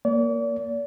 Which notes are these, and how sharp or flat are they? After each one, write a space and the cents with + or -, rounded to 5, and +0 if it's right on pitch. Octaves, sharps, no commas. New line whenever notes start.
A#3 +0 D5 -40